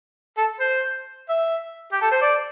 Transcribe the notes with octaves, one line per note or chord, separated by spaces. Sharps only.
A4
C5
E5
G4
A4
C5
D5